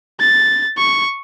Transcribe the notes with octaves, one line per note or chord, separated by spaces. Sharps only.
A6
C#6